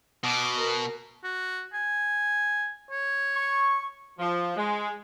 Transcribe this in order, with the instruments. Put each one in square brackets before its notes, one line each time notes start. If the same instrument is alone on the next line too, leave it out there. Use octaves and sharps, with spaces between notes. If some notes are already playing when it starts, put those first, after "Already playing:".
[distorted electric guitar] B2 [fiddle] D6
[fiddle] A#4
[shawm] F#4
G#5
C#5
[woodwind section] C#6
[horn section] F3
G#3